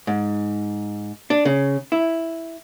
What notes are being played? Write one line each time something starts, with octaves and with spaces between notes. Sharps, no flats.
G#2
D4
C#3
E4